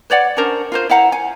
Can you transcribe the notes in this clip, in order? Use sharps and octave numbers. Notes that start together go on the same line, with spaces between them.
B4 C#5 D5 F#5
C#4 D4 A#4 C5
F4 A#4 C5
E4 F5 F#5 A#5
G#5